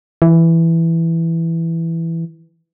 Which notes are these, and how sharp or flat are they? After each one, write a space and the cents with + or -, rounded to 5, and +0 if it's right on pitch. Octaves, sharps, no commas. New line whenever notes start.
E3 +5